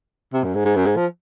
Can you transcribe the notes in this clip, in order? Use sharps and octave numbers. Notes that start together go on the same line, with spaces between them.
C3
F#2
G#2
G#2
F#2
G#2
F3